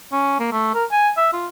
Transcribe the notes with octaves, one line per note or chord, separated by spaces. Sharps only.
C#4
A#3
A3
A#4
G#5
E5
F4